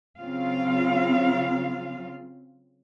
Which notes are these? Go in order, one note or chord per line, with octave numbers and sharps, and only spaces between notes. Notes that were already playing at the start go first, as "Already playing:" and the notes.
C#3 F#3 C4 F4 F5